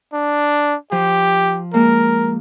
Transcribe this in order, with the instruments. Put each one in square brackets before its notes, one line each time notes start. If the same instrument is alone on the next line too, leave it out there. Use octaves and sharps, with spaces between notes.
[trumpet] D4
[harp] F3 [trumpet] G4
[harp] G#3 A#3 [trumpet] A#4